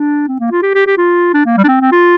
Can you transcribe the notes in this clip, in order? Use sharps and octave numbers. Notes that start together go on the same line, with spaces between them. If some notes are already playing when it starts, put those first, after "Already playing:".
Already playing: D4
C4
A#3
F4
G4
G4
G4
F4
D4
A#3
G3
D4
C4
C4
F4